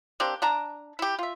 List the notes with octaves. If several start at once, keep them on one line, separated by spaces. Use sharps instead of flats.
A#3 C4 D4 G4
D4 G5 A5 A#5
E4 G4
F4 E5